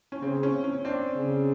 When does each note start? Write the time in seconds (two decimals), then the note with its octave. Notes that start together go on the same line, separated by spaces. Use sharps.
0.12 C#4
0.22 C#3 C4
0.43 C#4
0.64 C#4
0.85 C4 D4
1.16 C#3